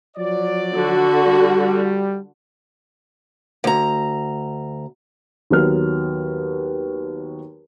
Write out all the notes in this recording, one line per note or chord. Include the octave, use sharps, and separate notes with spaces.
F3 F#3 D5
D3 F#4
G3
D2 A#5
D#2 F#3 B3 B4 F6